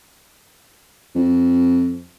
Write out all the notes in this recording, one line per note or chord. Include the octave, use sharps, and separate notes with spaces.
F2